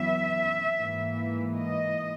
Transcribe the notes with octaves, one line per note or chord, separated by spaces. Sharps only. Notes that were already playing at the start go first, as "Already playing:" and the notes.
Already playing: F#2 E3 B3 E5
G#2 E3 A#3
D#5